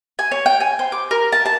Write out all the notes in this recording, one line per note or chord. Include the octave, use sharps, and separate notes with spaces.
G#5
C#5
G5
G#5
C5
D6
A#4
A5
A5